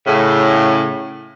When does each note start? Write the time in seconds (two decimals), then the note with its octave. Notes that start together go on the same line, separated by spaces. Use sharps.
0.06 A2 C#3